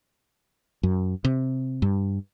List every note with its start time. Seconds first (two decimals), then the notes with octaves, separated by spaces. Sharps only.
0.83 F#2
1.25 C3
1.82 G2